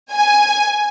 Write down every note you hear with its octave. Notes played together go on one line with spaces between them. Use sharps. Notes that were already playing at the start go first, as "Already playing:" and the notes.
G#5